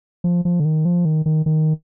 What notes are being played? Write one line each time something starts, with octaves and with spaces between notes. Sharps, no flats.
F3
F3
D3
D#3
F3
D#3
D#3
D#3